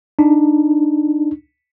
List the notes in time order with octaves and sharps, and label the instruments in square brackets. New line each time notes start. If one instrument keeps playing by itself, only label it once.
[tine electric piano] D4 D#4